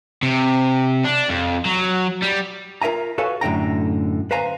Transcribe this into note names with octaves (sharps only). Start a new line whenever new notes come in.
C3
D4
F2
F#3
G3
F4 A#4 E5 G#5 A#5
F#4 A4 B4 C#5 F5 G#5
F#2 A2 D3 G5 A#5
B4 C5 F5 G#5 A#5 C6